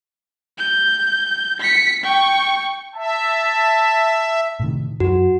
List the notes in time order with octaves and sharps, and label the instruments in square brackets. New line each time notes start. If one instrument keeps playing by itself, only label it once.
[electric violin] G6
B6 C#7
G5 C#6
[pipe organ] E5 [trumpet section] A5
[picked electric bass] A2 C3 D#3
[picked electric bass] F#2 F#3 [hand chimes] F#4